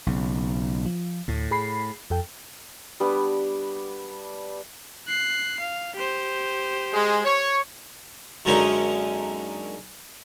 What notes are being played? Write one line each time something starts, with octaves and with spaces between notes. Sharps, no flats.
B1 C#3
F3
D2 A2
G#4 B5 C7
F2 A4 G5
G3 B3 D4
F#6 C7
F5
G4 C5
G#3
C#5
F#2 D3 G#3 A#3 C#4 D#4